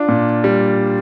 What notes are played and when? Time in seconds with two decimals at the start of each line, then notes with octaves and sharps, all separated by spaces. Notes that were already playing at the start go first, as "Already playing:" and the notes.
Already playing: D4 F4
0.08 A#2
0.44 G3